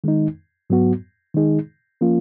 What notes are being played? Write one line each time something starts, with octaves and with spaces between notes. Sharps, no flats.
D#3 G#3 D#4
G#2 F#3 B3 F#4
D#3 G#3 D#4 G#4
F3 A#3 C#4 F4